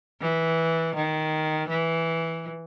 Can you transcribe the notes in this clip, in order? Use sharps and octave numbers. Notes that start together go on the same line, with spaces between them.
E3
D#3
E3